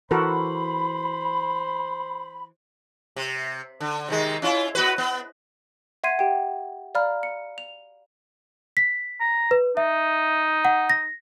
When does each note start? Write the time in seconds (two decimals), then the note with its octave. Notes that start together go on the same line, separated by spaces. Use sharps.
0.11 E3 F#4 A4 A#4 C5 B5
3.16 C3
3.80 D3
4.08 C3 D#3 G#3
4.42 C#4 E4 F4
4.75 B3 F#4 B4
4.98 B3
6.04 E5 F#5 C6 G#6 C7 D#7
6.19 G4 F#5 G5
6.95 D5 F5 A#5 B5 F6
7.23 C#7
7.58 F7
8.77 B6
9.20 A#5
9.51 B4
9.77 D#4 E5
10.65 F#5
10.90 A#6